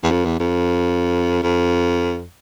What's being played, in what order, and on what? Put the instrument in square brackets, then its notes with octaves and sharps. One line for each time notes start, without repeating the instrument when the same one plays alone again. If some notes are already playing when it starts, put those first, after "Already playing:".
[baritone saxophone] E2
F2
E2
F2
F2